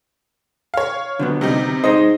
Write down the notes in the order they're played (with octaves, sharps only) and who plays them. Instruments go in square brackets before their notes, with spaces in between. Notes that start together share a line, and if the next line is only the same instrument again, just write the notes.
[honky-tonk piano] C#5 F5
[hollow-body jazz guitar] D3 F#3 B3
[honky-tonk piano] C3 G3 D#4
[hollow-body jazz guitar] D#4 G#4 C5 [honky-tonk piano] D#5